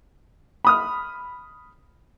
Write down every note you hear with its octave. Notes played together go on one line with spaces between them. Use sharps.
B5 D#6 F6